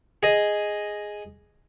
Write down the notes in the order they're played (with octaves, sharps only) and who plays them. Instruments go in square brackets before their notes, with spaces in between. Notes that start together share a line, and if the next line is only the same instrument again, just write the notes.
[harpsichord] G#4 D#5